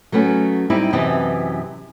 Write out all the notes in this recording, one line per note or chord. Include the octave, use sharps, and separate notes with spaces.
F#3 A3 B3 C#4
G3 C4 D#4 E4 G4
F#2 C3 E3 B3 D#5 A5